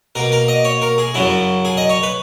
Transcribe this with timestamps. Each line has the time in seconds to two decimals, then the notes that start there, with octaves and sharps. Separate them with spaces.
0.15 B2 A#3 A#4
0.32 A#4
0.48 D#5
0.65 C#5
0.82 A#4
0.98 G#4
1.14 F#2 C#3 F#3 E4
1.65 G#4
1.77 D#5
1.89 C#5
2.03 B4